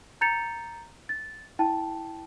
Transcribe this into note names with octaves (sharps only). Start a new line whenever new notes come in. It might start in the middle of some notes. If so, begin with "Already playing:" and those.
A#5 G6 A6 C#7 F7
A6
E4 G5 A5